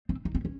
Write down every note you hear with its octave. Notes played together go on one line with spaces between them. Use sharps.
C4
D#4
C4
C#4